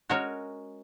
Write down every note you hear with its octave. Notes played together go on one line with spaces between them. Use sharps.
G#3 C#4 F#4 A#4 C#5